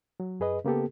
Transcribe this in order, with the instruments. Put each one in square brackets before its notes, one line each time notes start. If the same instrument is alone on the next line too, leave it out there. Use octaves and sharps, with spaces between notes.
[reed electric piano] F#3
F#2 G#4 B4 D#5
C#3 A#3 B3 G4 A4